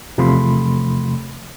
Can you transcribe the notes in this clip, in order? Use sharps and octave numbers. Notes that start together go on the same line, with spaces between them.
E2 C3 F3 A3 B5 C6